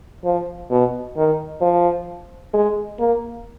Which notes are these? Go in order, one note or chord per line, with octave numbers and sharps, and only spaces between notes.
F3
B2
D#3
F3
G#3
A#3